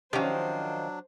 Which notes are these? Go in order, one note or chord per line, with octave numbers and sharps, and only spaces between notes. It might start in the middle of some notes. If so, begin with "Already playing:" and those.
D#3 F3 F#3 C#4 D4 G4 C5